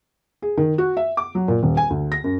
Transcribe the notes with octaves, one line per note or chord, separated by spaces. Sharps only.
G#4
D#3
F#4
E5
D6
F#3
A#2
D#1
G#5
D2
A#6
F#2